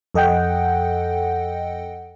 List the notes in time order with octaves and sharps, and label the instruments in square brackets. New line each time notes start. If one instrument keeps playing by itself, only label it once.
[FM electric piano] F2 A4 D#5 F#5 G5